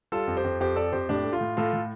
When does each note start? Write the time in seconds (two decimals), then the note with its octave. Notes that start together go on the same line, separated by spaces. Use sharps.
0.12 G3 F4 A4
0.27 F2
0.36 G4 C5
0.44 F2
0.60 F2 G4 C5
0.76 F2 A4 D5
0.92 F2 G4 C5
1.09 A2 D4 G4
1.25 A3
1.33 F4
1.41 A2
1.57 A2 F4 A4
1.73 A2